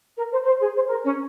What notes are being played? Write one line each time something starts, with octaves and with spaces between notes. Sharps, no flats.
A#4
C5
C5
G#4
C5
A#4
C#4